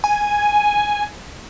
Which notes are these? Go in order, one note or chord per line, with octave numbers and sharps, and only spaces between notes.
G#5